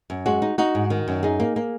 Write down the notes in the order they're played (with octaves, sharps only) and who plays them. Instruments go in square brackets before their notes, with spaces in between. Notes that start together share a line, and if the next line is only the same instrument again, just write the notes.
[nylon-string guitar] F#2
G#3 F#4
D#4
D#4 F#4
G#2
D#3
F#2
D#4 G#4
A#3
A#3